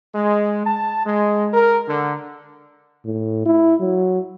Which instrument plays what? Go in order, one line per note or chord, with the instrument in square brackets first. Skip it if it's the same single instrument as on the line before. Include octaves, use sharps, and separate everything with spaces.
[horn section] G#3
A5
G#3
A#4
D3
[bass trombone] A2
E4
F#3